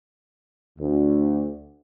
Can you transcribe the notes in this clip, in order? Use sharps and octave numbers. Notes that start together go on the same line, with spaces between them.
D2